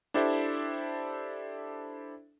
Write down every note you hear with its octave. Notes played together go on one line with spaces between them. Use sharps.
D4 E4 G4 A4 C5 E5